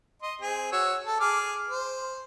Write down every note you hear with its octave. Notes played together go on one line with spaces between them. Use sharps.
D#5 C6
C4 G#4
F#4 C#5 E6
A4 A5
G#4 D6 F6
C5